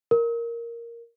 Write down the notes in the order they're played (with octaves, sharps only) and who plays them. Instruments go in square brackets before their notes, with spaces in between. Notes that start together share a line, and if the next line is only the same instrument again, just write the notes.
[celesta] A#4